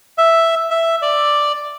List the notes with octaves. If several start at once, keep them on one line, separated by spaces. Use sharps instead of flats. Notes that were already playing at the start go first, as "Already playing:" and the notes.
E5
E5
D5